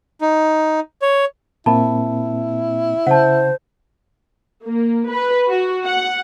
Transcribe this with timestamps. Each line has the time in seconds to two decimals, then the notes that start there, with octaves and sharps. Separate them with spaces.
0.21 D#4
1.02 C#5
1.66 A#2 A#3 C4 E4 A5 B5
3.07 C#3 C5 F#5 A5
4.65 A#3
5.11 B4
5.50 F#4
5.87 F#5